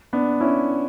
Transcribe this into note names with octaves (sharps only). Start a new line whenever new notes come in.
B3 D4
C#4 E4